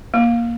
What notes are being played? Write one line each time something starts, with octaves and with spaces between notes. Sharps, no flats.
A#3